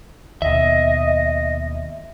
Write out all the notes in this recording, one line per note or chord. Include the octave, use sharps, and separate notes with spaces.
D#2 B2 D#5 E5